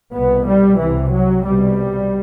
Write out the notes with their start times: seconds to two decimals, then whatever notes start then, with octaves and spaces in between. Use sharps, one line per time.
0.13 C2 B2 B3
0.46 G3
0.79 C2 C3 E3
1.12 F#3
1.45 C2 B2 G3